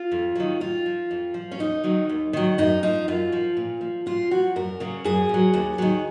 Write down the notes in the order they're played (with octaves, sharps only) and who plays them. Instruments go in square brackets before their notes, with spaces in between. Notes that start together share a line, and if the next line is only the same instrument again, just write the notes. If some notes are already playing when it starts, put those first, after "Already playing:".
Already playing: [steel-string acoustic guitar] F4
F2
D#3 F#3
F2 F4
F3
F2
F3
C#4
D#2 D#4
D#3 F#3
D#2
D#3 F#3
F#2 D#4
F3 D#4
F#2 F4
F3
A#2
F3
A#2 F4
F3 F#4
F#2 A#4
C#3 F#3
F#2 G#4
C#3 F#3
D#2
D#3 F#3